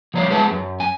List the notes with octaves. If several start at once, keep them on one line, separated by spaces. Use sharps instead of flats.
F3 G3 C#5 D5 E5 F5
G#3 G#4 B4 E5 F#5 A5
F#2
G#5